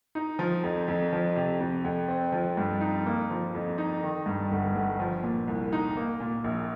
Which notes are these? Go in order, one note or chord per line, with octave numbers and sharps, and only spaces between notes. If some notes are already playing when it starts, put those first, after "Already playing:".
D#4
F3
F2
F2
F3
C3
F2
F2
C4
F3
G2
D#4
A#3
F3
F2
D#4
D#3
G2
G1
G1
F3
A#2
C2
D#4
A#3
A#2
A#1